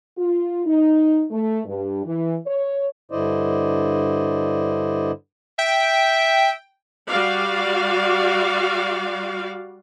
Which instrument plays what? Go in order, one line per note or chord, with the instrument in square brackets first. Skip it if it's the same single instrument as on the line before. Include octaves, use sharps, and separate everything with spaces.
[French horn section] F4
D#4
A3
G2
E3
C#5
[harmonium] G2 D3 E4 C5 D5 D#5
[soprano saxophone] E5 [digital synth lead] G5
[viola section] G3 F#4 D5 F5